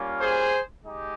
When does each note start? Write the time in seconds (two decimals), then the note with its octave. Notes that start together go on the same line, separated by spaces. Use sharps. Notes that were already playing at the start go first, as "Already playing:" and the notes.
Already playing: G3 A#3 C#4 F4
0.20 G#4 C5
0.83 G#3 D#4 G4